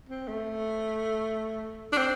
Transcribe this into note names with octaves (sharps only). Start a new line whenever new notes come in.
C4
A3
D4
C4